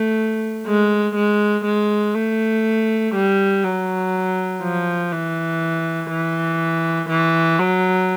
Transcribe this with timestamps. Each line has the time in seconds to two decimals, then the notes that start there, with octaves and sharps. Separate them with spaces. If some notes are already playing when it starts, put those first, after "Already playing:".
Already playing: A3
0.67 G#3
1.16 G#3
1.65 G#3
2.15 A3
3.15 G3
3.64 F#3
4.63 F3
5.13 E3
6.11 E3
7.09 E3
7.59 F#3